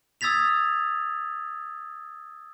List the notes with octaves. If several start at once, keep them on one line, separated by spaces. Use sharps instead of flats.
D#6 E6 G#6 A6 B6 F7